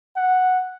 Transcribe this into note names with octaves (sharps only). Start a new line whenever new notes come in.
F#5